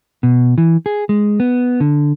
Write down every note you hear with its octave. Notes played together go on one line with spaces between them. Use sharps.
B2
E3
G#4
G#3
B3
D3